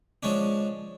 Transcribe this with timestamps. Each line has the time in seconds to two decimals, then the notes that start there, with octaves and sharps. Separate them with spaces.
0.23 F3 G#3 C#4 D4